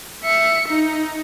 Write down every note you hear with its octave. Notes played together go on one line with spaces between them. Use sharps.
E5 C#7
D#4